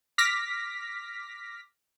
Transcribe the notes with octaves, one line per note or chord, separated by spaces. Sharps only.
D6 F6 A#6 B6